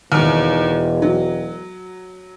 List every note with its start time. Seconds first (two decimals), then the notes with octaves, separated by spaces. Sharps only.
0.12 E1 D#2 F6
1.02 F#3